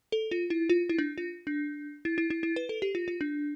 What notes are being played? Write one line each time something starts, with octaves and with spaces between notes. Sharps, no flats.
A4
F4
E4
F4
E4
D4
F4
D4
E4
E4
E4
E4
B4
A4
G4
F4
F4
D4